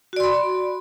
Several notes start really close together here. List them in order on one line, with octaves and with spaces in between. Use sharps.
F#4 D5 C6 B5